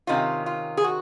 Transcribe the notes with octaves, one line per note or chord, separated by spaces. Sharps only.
C3 D#3 C#4 F4
F4
G#4
F#4